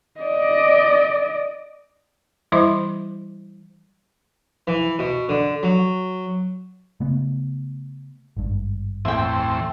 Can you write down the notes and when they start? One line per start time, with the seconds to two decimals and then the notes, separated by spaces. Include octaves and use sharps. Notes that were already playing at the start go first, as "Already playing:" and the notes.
0.20 D5 D#5
2.52 E3 G3 E4 C5 E5 D6
4.67 E3
4.99 B2
5.29 D3
5.63 F#3
7.00 C#3 A3 B3
8.37 G#1 G2
9.05 E2 A2 C4 E5 G5